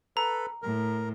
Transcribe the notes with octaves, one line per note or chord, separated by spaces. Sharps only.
A4 B4 A#5
A2 A#4